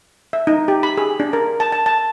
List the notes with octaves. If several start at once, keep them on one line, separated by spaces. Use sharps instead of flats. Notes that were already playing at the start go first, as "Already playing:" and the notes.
E5
D#4
G4
B5
G#4
D4
A#4
A5
A5
A5